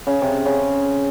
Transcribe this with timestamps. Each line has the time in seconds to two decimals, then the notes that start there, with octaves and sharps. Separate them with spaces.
0.07 C#3
0.22 C3
0.45 C#3